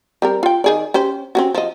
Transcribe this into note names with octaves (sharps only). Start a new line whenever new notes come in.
G3 C4 A#4
F4 G5
D#3 G#4 D5
C#4 G4 C5
C4 C#4 F#4
F3 D#5